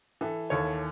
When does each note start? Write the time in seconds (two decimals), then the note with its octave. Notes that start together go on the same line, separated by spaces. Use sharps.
0.21 E3 A4
0.50 D#2 A4 C#5